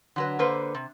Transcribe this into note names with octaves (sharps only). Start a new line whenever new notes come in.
D3 F#3 B4
D3 A#3 B4 C5
C3